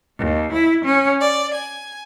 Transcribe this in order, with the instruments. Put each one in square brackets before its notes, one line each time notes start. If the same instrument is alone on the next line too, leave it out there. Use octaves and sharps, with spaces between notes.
[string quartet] D#2
E4
C#4
D5
G#5